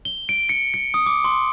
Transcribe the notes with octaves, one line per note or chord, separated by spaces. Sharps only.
G7
D7
C#7
C#7
D#6
D6
C6